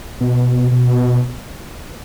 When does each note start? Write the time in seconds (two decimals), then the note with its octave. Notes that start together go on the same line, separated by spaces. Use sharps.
0.21 B2
0.72 B2